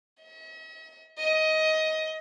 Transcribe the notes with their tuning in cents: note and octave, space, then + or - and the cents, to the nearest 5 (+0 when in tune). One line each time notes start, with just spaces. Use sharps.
D#5 +45
D#5 +15